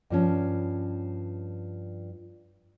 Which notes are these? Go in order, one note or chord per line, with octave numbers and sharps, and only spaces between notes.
G2 F3 C#4